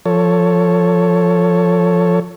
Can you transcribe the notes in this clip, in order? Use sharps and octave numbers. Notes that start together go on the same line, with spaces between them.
F3 A4 C#5